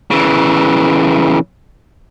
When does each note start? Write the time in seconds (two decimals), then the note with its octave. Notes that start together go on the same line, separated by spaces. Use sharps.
0.11 C#3 E3